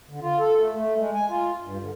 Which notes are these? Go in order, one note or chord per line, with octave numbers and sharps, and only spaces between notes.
D3
F4
A4
A3
A3
G#3
G#5
F4
G2
D3